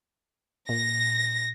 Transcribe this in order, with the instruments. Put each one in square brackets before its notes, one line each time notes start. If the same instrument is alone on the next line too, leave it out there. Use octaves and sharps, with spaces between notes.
[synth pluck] A#2 [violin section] A#6